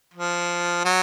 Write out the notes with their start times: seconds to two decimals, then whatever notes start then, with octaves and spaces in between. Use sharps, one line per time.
0.14 F3
0.85 F#3